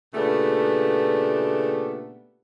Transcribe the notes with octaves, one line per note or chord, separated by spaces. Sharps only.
A#2 C#3 A3 B3 D4 G4